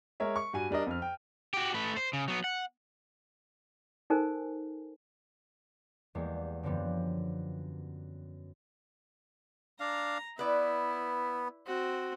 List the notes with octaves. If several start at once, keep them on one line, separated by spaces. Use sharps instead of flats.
G#3 A#4 C#5 E5
C#6
G2 F#4 G#5 D#7
G3 D4 A#4 D#5
F2 F6
G5
F#4 G4
A3 B4
C5
C#3
F#3 B3
F#5
D#4 A4 A#4 C5 G#5
E2 G3 G#3 A#3
F#2 D3 F3 G3 B3
D4 F5 A#5
B3 E4 B4 D5
C4 F#4